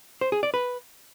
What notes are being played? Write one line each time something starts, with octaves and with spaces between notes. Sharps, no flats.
C5
G#4
D5
B4